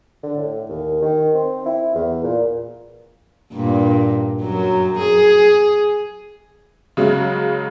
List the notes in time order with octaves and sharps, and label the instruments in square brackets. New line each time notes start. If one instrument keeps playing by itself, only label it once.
[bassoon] D3
A2
D#2
D#3
C4
E4
E2
A#2
[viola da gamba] G2 A#2
F#2 F#3
G#4
[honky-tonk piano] C#3 F#3 G#3